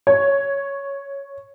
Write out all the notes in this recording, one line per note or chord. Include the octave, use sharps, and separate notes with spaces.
C#5